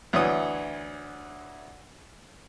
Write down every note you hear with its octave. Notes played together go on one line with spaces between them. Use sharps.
D2 E3 C#5 D#6